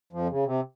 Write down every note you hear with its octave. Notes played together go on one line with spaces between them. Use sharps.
F2 F3
C#3
C3